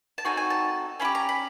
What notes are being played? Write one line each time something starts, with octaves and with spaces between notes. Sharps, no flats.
A5
C4 D#4 F#4 A4 G#5
G#5
A5
C#4 E4 B5
G4
A#5
B5